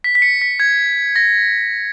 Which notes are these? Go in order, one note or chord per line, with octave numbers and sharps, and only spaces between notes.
B6
B6
C#7
B6
G#6
A#6